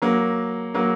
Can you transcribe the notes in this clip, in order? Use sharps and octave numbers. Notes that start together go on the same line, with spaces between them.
F#3 A#3
F#3 A#3